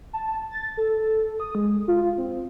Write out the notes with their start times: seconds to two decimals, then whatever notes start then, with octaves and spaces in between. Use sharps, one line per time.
0.13 A5
0.51 A6
0.77 A4
1.40 D#6
1.55 G#3
1.88 F4
2.18 C4